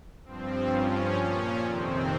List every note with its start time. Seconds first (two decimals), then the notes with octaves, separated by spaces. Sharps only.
0.24 G2 F3 C4
0.69 G2 F3 C#4
1.15 A#2 F3 C#4
1.60 F2 C3 D#3 C4